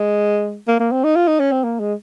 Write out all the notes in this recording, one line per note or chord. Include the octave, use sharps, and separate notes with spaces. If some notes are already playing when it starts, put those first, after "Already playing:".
Already playing: G#3
A#3
A#3
C4
D#4
F4
D#4
C#4
C4
A#3
G#3